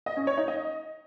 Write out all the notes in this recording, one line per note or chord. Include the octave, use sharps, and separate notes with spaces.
D#5
C#4
C#5
D#4
D#5